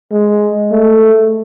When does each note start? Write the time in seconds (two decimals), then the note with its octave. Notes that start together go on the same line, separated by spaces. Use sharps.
0.12 G#3
0.72 A3